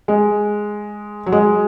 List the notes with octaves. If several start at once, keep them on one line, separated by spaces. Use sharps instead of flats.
G#3
F#3
G#3